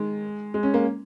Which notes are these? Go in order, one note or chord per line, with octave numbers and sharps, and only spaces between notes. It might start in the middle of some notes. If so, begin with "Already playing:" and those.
Already playing: D#3 G#3
G#3
C#4
A#3